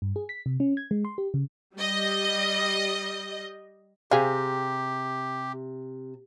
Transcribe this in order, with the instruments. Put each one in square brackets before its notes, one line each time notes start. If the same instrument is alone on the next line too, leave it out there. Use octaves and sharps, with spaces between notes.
[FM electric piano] G2
G#4
B6
C3
C#4
G#6
G#3
C6
G4
C#3
[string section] G3 D#5
[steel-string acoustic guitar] C3 [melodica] G4 [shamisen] G#4 F5